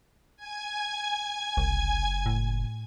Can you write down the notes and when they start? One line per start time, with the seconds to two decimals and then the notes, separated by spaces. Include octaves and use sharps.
0.37 G#5 G#6
1.57 F#1 C2
2.26 A2